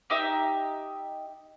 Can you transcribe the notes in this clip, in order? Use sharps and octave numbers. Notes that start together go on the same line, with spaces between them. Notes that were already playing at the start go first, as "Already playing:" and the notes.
D#4 G4 E5